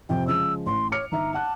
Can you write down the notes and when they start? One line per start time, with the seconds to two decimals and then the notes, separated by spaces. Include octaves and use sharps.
0.09 F2 C3 F3 G5
0.28 C#3 F3 G#3 E6
0.66 A1 C6
0.92 C#5 D6 F6 C#7
1.12 G1 D#4 E5 A#5
1.34 F#5 A5 F#6